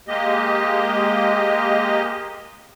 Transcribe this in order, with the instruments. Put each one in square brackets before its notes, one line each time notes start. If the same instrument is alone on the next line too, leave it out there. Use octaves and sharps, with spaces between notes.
[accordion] G#3 A#3 G4 D#5